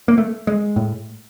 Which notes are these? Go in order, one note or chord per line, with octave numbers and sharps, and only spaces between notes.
A#3
A3
G#3
A2